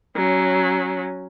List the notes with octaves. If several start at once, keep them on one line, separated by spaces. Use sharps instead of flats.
F#3 C#4